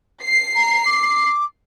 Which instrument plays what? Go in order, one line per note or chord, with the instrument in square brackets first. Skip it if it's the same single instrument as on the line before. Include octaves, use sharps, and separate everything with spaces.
[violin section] C7
[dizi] A#5
D6